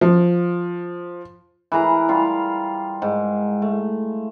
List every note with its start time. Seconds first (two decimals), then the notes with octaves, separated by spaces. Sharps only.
0.01 F3
1.72 E3 G#4 A#4 A#5
2.09 G3 F4 F5
3.02 G#2
3.62 A3